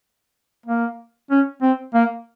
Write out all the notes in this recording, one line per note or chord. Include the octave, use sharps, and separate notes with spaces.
A#3
C#4
C4
A#3